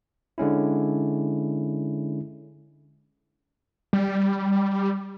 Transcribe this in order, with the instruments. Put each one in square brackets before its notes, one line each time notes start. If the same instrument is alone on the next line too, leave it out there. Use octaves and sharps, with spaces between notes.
[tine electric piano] D3 G#3 C#4 E4
[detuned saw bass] G3